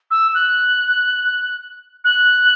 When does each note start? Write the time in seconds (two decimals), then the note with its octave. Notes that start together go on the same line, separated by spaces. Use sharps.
0.11 E6
0.34 F#6
2.04 F#6